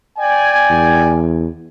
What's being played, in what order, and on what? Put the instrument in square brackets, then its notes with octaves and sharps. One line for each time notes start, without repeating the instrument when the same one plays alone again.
[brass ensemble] D5 G5 G#5
[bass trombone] E2